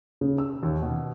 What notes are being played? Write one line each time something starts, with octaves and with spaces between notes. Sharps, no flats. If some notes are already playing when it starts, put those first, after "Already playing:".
C#3
E6
D#2
B2